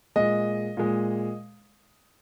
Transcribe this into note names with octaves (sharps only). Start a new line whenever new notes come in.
A#2 G#3 D#5
A#2 G#3